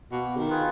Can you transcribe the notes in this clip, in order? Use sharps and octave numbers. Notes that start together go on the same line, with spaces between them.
B2 A#3
D#3
F4 G#4 B4